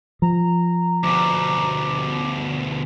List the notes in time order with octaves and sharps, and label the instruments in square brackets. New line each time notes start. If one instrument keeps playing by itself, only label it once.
[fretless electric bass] F3 [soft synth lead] A#5
[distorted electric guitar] D2 B2 [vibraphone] D6